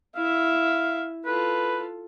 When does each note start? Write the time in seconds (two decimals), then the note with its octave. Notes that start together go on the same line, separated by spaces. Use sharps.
0.15 E4 E5 F5
1.26 F4 A4 B4